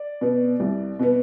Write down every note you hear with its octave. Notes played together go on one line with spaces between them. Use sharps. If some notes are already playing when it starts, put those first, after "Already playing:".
Already playing: D5
B2 B3
C2
B2 B3